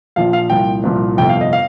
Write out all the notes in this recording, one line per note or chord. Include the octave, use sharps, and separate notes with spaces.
A#1 A#2 F3 F5
F5
C2 A#2 F3 G5
C2 A#2 F3
G1 F2 C3 G5
F5
D#5
F5